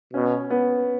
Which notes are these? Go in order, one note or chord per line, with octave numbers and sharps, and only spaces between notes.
B2 C#4
B3